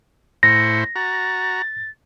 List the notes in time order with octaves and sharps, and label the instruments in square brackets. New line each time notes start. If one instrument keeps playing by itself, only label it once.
[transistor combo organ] A2 E4 C5 [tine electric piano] A#6 [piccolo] C#7
[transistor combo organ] F#4 A#5 [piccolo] A6